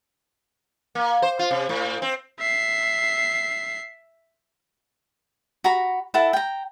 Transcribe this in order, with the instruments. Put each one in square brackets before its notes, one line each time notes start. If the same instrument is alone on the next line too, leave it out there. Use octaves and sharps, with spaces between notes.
[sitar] A#3
C5
F4
C3
A2
C4
[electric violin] E5 C7
[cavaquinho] F#4 A#5 B5
E4 A4 F#5 A5
G5 A#5